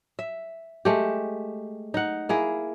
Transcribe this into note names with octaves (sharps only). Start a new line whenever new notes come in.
E5
G#3 A3 G4
D#4 F#5
A#3 E4 G#4